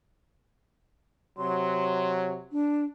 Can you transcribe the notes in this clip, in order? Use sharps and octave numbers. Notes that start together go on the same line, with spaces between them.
C3 F#3 C6
D4